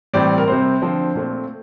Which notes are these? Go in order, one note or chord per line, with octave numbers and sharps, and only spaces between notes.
A2 E3 G3 C4 D5
A#4
C3 G3 C4 C5
D3 F3 C4
A#2 A3 C4